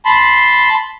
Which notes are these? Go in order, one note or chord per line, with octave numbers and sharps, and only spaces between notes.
A5 B5 C6